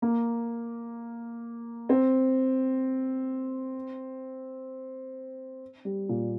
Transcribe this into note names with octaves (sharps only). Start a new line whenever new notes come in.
A#3
C4
G3
A#2